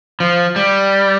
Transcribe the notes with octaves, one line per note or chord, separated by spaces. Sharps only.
F3
G3